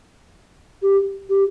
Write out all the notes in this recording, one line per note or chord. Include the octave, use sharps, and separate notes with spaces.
G4
G4